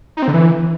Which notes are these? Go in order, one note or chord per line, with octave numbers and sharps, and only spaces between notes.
D#4
C4
D3
E3